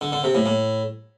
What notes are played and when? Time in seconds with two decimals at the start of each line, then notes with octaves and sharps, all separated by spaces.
0.01 D3
0.12 D3
0.24 C3
0.35 A2
0.46 A2